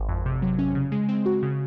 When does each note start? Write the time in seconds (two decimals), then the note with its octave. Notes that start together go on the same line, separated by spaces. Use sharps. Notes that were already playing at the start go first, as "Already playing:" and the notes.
Already playing: G#1
0.09 F2
0.26 C3
0.42 F#3
0.59 C#4
0.75 C#3
0.92 G#3
1.08 C4
1.26 F#4
1.43 C#3